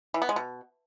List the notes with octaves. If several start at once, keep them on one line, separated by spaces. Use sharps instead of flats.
E3
B3
G#3
B2